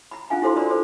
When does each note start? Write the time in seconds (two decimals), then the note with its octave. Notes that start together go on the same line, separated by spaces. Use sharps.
0.11 A#5 B5
0.30 C#4 D4 F4 F5 G#5
0.42 E4 F#4 A4 C5 A#5 C6
0.57 F4 A#4 D5 B5
0.70 A4 C5